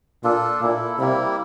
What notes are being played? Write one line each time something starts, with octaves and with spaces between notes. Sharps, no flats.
A#2 D4 F4 A4
A#2 A#3 E4 A4
C3 G3 A#3 E4